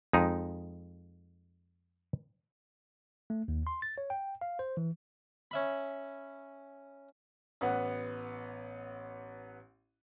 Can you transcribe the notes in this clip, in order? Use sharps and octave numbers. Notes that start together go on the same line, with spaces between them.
F2 G#3 D#4
A3
D#2
C6
A6
C#5
G5
F5
C5
E3
C#4 E5 B5
A1 B3 F#5